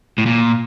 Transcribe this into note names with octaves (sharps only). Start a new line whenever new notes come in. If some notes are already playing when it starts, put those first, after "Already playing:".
A2
A#2